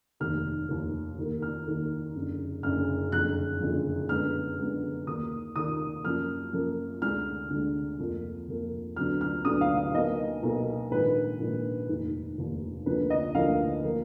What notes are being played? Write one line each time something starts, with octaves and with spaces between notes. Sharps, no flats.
F1 D#2 D#3 F6
F1 D#2 D#3
D#2 D#3 A#3
F6
D#2 D#3 A#3
F#1 F#2 D3
F#1 F#2 D3 F6
F#1 F2 D3 F#6
F#1 F2 D3
F#2 D3 G#3 B3 F6
F#2 D3 G#3 B3
D#2 D#3 A#3 D#6
D#2 D#3 A#3 D#6
F#2 F3 A#3 F6
F#2 F3 A#3
D2 D3 G#3 F6
D2 D3 G#3
F2 F3 A#3
F2 F3 A#3
D2 D3 F#3 B3 F6
F6
D2 D3 F#3 B3 D#6
F5
F5
B1 B2 A#3 D#5
B1 B2 A#3
A#1 G#2 D#3 A#3 B4
A#1 G#2 D#3 A#3
F1 D#2 D#3
F1 D#2 D#3
D2 D3 F3 A#3 B4
D#5
D2 D3 F3 A#3 F5
F3 A#3